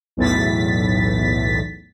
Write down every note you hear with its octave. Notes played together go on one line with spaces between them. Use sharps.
B1 E2 A2 A6 B6